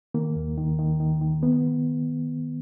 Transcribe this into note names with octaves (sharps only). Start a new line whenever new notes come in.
D#3 A#3
D#2
D#3
D#3
D#3
D#3
B3